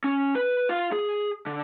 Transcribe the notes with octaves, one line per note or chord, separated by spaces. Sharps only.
C#4
B4
F4 F5
G#4
D3